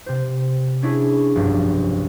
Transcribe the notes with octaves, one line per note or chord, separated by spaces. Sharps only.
C3 C5
C#4 D4 E4 G#4 C#5
F1 B1 G2